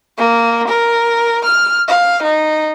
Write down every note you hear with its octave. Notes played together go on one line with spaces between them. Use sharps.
A#3
A#4
F6
F5
D#4